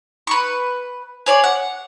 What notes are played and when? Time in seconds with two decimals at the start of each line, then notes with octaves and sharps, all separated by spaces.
0.27 B4 C#6
1.26 G#4 C#5 D5
1.44 F#5